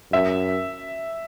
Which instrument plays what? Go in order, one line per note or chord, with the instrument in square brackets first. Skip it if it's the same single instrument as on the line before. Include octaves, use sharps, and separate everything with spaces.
[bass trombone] F#2 [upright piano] E5